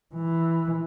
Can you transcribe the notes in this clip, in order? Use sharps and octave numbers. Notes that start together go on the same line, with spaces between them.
E3